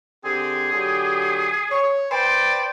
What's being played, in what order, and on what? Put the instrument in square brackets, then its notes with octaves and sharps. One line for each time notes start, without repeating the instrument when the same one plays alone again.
[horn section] D3 C4 G4 [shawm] G#4
[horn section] D3 F#3 G4
C#5
[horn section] B4 C5 G5 [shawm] D5